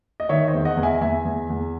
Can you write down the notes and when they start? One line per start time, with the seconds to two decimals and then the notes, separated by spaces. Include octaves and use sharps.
0.20 D#5
0.29 D#3 C#5 E5
0.48 C5 D#5
0.54 E2
0.65 D#5 F#5
0.77 E2
0.83 E5 G#5
1.01 E2 E5 G#5
1.25 E2
1.50 E2